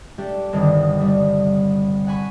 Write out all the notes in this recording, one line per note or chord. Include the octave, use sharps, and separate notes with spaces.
A3 D4 G4
G1 C2 D3 D#3 G3
G3 A3
F#5 G#5 B5 C#6